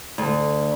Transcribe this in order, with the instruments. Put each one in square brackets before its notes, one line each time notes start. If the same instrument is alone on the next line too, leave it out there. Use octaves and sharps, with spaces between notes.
[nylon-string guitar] D2